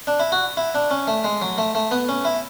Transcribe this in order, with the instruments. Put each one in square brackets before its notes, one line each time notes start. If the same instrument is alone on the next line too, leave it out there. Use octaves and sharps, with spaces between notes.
[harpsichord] D4
E4
F#4
E4
D4
C#4
A3
G#3
F#3
A3
A3
B3
C#4
E4